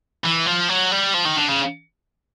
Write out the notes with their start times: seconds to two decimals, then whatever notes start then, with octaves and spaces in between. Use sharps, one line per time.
0.24 E3
0.46 F3
0.69 F#3
0.91 G3
1.14 F3
1.25 D#3
1.36 D3
1.48 C#3